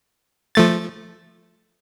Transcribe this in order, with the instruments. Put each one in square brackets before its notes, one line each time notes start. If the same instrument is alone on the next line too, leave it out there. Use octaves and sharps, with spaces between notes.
[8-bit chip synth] F3 A3 A6